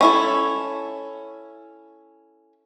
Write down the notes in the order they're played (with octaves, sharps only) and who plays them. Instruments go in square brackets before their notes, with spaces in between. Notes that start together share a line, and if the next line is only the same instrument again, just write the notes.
[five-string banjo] C#4 E4 A4